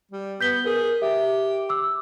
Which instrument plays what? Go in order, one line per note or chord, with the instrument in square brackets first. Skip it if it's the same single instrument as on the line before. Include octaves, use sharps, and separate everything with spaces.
[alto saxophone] G3
[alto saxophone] B3 [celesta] G6 B6 G7
[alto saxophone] G#4 [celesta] A#4
[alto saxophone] G4 [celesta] E5
[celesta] D6 E6